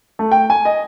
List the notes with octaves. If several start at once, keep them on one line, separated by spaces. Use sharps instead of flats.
A3
G5
G#5
D#5